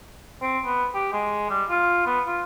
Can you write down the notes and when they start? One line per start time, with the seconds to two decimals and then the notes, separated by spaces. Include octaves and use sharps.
0.42 C4
0.65 B3
0.95 G4
1.13 G#3
1.50 G3
1.70 F4
2.06 B3
2.27 F4